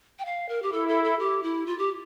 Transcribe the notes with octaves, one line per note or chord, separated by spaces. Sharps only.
G5
F5
A#4
G4
E4 A4
A4
A4
G4
E4
F4
G4